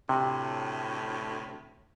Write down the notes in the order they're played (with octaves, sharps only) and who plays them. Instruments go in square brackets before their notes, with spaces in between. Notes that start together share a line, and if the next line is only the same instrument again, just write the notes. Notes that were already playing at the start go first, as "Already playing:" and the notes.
[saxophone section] D2 A2 [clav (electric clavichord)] C3